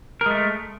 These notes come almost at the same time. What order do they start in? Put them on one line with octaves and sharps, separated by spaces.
A#4 G#3 A3